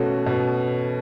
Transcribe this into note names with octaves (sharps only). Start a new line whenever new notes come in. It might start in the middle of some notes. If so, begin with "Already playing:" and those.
Already playing: B2 A3 C#4 F#4
B2